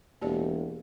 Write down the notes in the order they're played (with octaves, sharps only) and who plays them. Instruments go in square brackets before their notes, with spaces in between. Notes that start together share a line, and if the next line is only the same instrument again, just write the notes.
[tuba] E1 [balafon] A#3 G4 D5